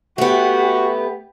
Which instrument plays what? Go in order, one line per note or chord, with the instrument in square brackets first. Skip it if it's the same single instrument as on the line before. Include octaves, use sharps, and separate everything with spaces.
[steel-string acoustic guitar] A3 B3 [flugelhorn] F#4 [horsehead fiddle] G4